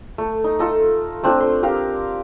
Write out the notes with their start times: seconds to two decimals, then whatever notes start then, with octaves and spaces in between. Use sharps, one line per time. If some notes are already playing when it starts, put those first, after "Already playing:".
0.18 A3
0.44 D#4
0.59 F4 A4 D#5
1.23 A3 C4 D4 F4
1.40 C6
1.63 G4 A#4 F5